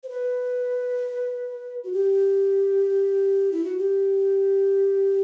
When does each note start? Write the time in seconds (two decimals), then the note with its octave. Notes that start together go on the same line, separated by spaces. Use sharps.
0.03 C5
0.09 B4
1.84 F#4
1.93 G4
3.52 E4
3.64 F#4
3.78 G4